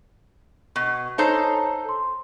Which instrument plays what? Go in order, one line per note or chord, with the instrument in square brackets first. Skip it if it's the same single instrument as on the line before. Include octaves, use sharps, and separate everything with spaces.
[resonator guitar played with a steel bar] B2 [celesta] C#6
[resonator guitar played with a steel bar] D#4 A4 C5 [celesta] C#5 A5 A#5
[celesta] C6